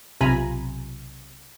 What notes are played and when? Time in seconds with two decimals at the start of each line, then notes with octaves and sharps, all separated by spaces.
0.21 B1 C3 F4 G#5 A#5 B5